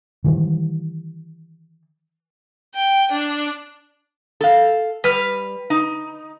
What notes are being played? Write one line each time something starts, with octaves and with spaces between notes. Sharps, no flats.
D#3 E3 G3
G5
D4
A4 F5
G3 B4 F6
D#4